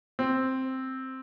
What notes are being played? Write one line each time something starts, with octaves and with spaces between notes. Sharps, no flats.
C4